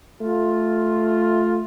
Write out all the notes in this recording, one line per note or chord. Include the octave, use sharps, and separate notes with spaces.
A3 F4